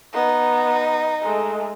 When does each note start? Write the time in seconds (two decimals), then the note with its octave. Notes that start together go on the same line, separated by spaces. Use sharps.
0.14 B3 D#4
1.22 G#3 A3